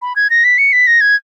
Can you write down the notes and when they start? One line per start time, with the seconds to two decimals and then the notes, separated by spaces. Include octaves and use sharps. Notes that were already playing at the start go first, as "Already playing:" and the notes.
0.02 B5
0.16 G#6
0.30 A#6
0.44 B6
0.58 C#7
0.72 B6
0.87 A#6
1.01 G#6